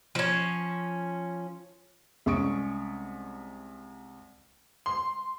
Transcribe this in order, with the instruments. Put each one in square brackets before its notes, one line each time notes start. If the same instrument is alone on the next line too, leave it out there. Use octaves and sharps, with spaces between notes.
[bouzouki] F3 C#4
[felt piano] C2 G#3 C#4 C#6 D#6 D7
[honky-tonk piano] C6